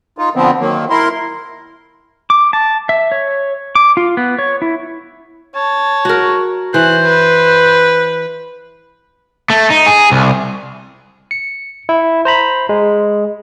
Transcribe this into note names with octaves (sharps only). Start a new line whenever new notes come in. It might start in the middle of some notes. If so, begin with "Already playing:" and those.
D#4 F4
D3 F3 B3 C4
D#3 F#3 A#3
E4 A#4 C6
D6
A5
E5
C#5
D6
F4
B3
C#5
E4
C#5 A5
F#4 A#4
E3 C5 F#6
B4
A3
D#4
G#4
C2
C#7
E4
C5 A#5 B5
G#3